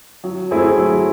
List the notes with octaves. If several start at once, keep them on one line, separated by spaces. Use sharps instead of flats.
F#3
A3 C4 E4 G#4
F#3